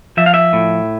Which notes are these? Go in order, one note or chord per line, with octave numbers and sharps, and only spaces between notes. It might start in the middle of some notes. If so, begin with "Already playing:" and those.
F3 E5
F5
E5
A2